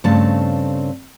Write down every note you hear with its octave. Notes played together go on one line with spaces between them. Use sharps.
G2 C#3 A3 C4 A5